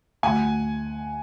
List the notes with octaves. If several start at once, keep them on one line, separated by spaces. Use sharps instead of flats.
D2 F#5 G#5